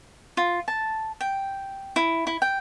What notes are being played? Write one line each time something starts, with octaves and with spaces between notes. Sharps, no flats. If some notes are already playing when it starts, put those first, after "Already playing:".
F4
A5
G5
E4
E4
G5